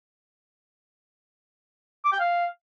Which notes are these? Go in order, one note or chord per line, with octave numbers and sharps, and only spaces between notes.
D6
G5
F5